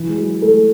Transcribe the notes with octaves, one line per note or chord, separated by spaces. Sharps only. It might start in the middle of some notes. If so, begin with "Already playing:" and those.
Already playing: E3
G#3
F#3
A3